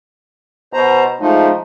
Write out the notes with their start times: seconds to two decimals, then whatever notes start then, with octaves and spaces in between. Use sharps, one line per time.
0.73 B2 C5 A#5
1.21 F3 G#3 A3 D#4